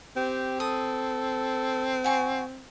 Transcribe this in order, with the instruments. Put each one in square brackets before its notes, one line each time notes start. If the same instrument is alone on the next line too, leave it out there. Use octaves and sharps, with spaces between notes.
[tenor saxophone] C4 [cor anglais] G4
[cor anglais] A4 [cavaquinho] D#6
[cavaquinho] F#4 G#5 C#6